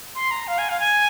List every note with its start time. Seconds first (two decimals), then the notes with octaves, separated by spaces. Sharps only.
0.15 C6
0.31 A#5
0.47 F5
0.58 G#5
0.69 F5
0.80 G#5